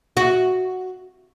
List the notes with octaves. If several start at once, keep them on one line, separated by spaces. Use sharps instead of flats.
F#4